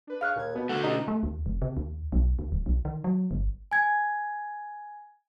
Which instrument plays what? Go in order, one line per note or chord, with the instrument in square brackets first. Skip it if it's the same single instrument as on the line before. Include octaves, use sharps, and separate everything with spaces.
[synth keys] D4 B4
[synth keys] G#4 C#5 C#6 [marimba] F5 F6 F#6
[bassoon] D#2 [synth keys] A#2 G#6
[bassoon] B2 [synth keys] B3
[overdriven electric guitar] D3 A3 [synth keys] D#4 F5 D6 [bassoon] F#4
[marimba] B2 [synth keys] C#4 F4 G4 [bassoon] D#4
[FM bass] A3
D#2
F1
C3
D#2
B1
D#2
D#1
B1
D#3
F#3
G1
[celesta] G#5 G#6